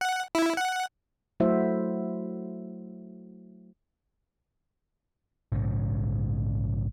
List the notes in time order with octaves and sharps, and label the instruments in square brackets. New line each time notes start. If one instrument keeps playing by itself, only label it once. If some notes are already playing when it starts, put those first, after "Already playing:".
[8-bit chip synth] F#5
E4
F#5
[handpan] F#3 A3 E4 F#4 C5 E5
[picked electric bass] A#1 G#2 C#3